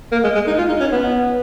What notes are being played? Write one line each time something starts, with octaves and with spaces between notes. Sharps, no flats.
A#3
G#3
G#3
D#4
F4
D#4
C#4
B3